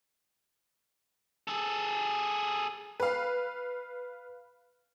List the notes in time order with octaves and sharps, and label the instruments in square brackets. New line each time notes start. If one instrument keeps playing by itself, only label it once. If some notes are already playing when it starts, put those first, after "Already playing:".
[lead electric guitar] G#4 A4
[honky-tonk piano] B4 F5